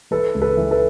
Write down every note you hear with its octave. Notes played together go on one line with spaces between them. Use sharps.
E3 A4 B4
C#2
A4 B4
E3
A4 B4